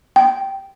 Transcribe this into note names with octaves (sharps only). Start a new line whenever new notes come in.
G5